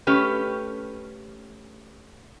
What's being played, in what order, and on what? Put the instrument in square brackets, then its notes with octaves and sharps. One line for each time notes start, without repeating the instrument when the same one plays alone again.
[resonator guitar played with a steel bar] A3 C#4 G4 B4